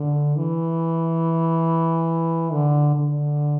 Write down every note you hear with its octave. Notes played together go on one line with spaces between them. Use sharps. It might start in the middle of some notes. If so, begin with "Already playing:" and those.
Already playing: D3
E3
D3
D3